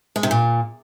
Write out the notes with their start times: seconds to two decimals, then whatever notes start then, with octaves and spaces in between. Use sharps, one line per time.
0.16 G#3
0.23 C3
0.31 A#2